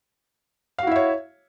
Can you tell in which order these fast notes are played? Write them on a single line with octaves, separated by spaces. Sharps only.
F5 F#4 E4 E5 C#5